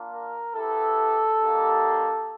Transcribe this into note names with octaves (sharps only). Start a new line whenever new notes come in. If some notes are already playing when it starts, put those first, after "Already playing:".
Already playing: A#3 D4 F4
A#4
B3 E4 G4 A4
G3 A#3 D#4 G4